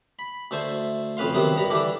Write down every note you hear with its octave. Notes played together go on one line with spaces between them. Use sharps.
B5
D2 A3 C5 C#6
F2 C#3 B4 F5 C6
C3 D#3 F#3 B3
G2 A#5 B5
D3 E3 G3 D4